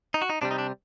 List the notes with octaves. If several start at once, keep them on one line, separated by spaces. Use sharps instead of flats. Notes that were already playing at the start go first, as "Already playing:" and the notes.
D#4
F#4
D#4
C3 G3 D4
D#4
D4